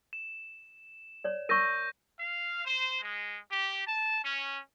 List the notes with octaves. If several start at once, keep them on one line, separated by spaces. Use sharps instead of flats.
E7
C#5 D5
A#4 C#6 G6 A#6 D#7
F5
C5
G#3
G4
A5
C#4